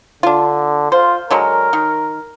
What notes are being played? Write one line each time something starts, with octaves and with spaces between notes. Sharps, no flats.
D3 D4 F4
F4 C5
D3 F#3 G#3 A#4
D#3